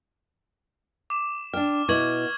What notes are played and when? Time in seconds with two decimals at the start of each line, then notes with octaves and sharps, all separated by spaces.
1.10 D6 E7
1.54 D4 G5 F6
1.89 B2 E4 B4 C#6 G#6 F#7